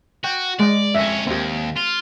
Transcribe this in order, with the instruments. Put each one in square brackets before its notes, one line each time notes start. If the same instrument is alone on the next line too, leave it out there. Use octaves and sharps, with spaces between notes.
[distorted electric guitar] F#4 [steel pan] G5
[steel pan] G#3 D#5 [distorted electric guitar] D5
[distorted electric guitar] F2 C#4 [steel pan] E5
[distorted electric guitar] D#2 [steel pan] C4 G4
[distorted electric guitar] F4